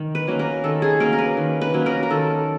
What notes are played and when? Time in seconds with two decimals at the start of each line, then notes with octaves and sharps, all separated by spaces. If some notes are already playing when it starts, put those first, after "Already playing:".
Already playing: D#3
0.15 B4
0.27 F#3 A#3 C#4
0.39 A#4
0.64 D#3 A4
0.82 G#4
1.00 F#3 A#3 C#4 A#4
1.13 A#4
1.19 B4
1.37 D#3
1.61 B4
1.74 F#3 A#3 C#4
1.86 A#4
2.03 A#4
2.11 D#3 A4